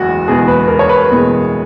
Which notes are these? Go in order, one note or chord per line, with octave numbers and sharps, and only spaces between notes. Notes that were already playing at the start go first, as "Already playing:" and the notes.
Already playing: F#1 E2 G#3 F#4
F#1 E2 B2 G#3 G#4
B4
A#4
C#5
B4
F#1 E2 B2 G#3